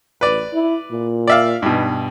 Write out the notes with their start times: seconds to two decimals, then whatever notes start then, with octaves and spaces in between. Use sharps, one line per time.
0.21 A1 B4 D5
0.53 E4
0.91 A#2
1.27 D5 E5 F5
1.62 G2 B2 D#4